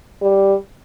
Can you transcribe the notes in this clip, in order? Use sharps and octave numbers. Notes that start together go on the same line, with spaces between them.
G3